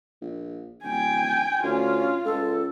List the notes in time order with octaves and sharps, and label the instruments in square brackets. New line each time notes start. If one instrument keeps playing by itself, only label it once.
[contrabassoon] A#1
[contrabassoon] D1 [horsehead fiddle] G5 G#5
[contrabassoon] D2 [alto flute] C#4 [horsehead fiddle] F4
[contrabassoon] C#2 [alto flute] A4